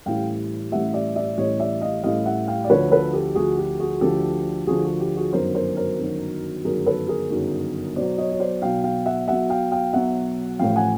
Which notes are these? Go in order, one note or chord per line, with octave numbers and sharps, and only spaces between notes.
A1 A2 E3 G3 F5 G5
A1 A2 E3 G3 E5 F#5
D5 E5
D5 E5
A1 A2 E3 G3 C#5 D#5
D5 E5
D#5 F5
A1 A2 E3 G3 D#5 F5
E5 F#5
F5 G5
D5
D2 D3 F3 B4 C#5
A4 B4
G4 A4
D2 D3 F3 F#4 G#4
G4
F#4 G#4
D2 D3 F3 G4 A4
D2 D3 F3 F#4 G#4
F#4
G4
F#4 G#4
G1 F#2 D#3 F#3 A#4 C5
A#4 C5
A#4 C5
G1 F#2 D#3 F#3
G1 F#2 D#3 F#3 G#4 A#4
A4 B4
G#4 A#4
G1 F#2 D#3 F#3
B1 B2 F#3 C5 D5
C#5 D#5
C#5
C5 D5
B1 B2 F#3 F5 G5
F5 G5
E5 F#5
B1 B2 F#3 E5 F#5
F5 G5
F5 G5
B1 B2 F#3 E5 F#5
A1 A2 F3 F5 G5
F#5 G#5